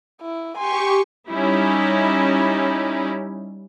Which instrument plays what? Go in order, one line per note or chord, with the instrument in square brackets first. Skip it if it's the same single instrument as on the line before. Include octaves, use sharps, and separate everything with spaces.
[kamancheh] E4
[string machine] G4 C#6 [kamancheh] G#5 C6
[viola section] G3 C#4 D#4 E4